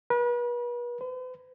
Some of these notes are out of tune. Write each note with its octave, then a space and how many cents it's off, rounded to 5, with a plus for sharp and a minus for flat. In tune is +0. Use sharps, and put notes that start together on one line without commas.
B4 -40
B4 +45